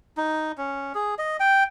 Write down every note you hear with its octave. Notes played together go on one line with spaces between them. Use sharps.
D#4
C#4
G#4
D#5
G5